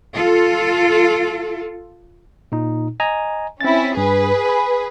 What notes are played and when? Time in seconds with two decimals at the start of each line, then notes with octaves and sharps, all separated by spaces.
0.14 F4 A4
2.52 A#2 D#4
3.00 D#5 G#5 A#5
3.61 C4 C#4 E4 A6
3.97 G2 G#4 B4
4.46 G#5 B5